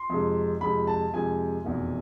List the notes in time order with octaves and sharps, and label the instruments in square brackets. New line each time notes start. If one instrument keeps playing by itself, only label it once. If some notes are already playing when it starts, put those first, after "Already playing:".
Already playing: [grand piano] C6
F2 C3 G#3
F2 C3 G#3 B5
A5
F2 C3 G#3 G#5
F1 E2 B2